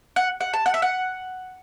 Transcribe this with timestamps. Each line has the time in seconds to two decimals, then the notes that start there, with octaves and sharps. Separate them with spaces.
0.16 F#5
0.41 F#5
0.54 A5
0.66 F#5
0.74 E5
0.82 F#5